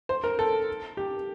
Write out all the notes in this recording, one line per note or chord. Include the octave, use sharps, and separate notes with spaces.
C5
A#4
A4
G4